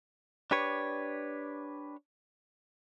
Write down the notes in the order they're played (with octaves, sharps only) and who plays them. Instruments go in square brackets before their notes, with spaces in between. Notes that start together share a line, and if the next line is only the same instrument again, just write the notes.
[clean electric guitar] D4 G4 B4 C#5